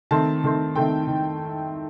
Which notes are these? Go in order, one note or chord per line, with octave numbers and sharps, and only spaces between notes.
D#3 A3 C4 A5
D#3 A3 C4
D#3 A3 C4 G5
D#3